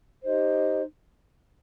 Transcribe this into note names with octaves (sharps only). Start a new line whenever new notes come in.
D#4 G4 C5 D#5